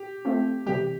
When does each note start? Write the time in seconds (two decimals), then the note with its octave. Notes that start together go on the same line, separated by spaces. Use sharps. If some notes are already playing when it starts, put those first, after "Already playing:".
Already playing: G4
0.25 A3 C4 F4
0.66 C3 E3 G3 G4